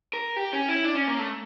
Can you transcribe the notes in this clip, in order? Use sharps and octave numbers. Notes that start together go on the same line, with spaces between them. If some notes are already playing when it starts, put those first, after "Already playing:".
A#4
G4
C#4
E4
D4
C#4
A#3
A3